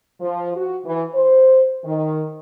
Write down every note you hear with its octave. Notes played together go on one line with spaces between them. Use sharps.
F3
F#4
E3
C5
D#3